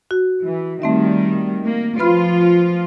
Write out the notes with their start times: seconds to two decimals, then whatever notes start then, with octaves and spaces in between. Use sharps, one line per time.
0.11 F#4
0.42 E3
0.82 D#3 G3 A3 C4 E5
1.64 A#3
1.99 F3 F4 B4 B5 F6